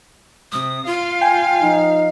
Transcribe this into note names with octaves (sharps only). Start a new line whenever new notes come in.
C3 D#6
F4 F5
G5 G#5
F3 D#4